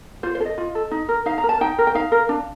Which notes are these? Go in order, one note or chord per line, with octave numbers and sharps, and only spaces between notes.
F4 C5
C5
A4
D#5
F4
A4
D#4
A#4
D#4 F5
A#5
A#4
A5
D#4 G5
A#4
G5
D#4 F5
A#4
D4